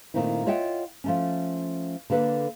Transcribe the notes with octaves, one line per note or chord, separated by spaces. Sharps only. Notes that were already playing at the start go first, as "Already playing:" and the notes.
A#2 D#3 A3 A#3 C4 E4
F4 C#5 D#5 E5 F#5 G5
F3 A3 C#4
D3 A#3 A4 B4